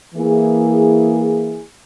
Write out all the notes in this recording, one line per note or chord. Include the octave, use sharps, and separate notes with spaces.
E3 A#3 E4 G#4